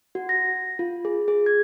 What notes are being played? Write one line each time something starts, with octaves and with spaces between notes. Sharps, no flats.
F#4
A#6
F4
G#4
G#4
G#6